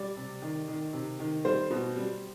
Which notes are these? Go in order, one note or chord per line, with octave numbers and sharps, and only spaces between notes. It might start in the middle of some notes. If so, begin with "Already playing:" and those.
Already playing: G3 D5
C3
D#3
D#3
C3
D#3
G3 C5
B2
G3